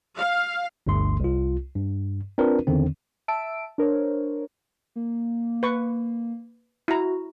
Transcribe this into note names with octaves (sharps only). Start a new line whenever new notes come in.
F5
G1 D2 G2 A3 C6
C2 F4
G2
C4 D4 F4 A#4 B4
E2 D3 D#3 C4
E5 A5 E6 D7
D4 A#4 C5 C#5
A#3
B4 C#6
E4 F#4 A#5